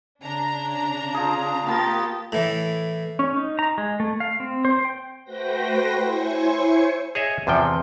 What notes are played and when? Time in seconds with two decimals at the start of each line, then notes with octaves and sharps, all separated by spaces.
0.24 C#3 D4 A#5
1.14 F3 G#4
1.67 F3 A#3 B3 G4 A#4 A6
2.32 A2 E3
3.19 C#4
3.37 D#4
3.59 A#5
3.78 G#3
4.00 A3
4.20 F5
4.40 C4
4.65 C5
4.85 G5
5.24 A3 F#4 B4 C5 G5 A#6
6.01 E4 C5 C#5 G#5 C#6
7.15 G#4 C#5 D#5 E5
7.47 E2 C3 F3 G5